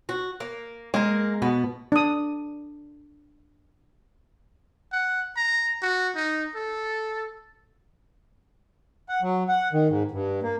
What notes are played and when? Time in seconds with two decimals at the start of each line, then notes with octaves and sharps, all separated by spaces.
0.09 F#4
0.40 A#3
0.94 G#3 A#3 A#4
1.42 B2 B3
1.92 D4 D#6
4.92 F#5
5.36 A#5
5.82 F#4
6.16 D#4
6.55 A4
9.09 F#5
9.22 F#3
9.49 F#5
9.73 D#3
9.89 G#2
10.11 G2
10.42 A#3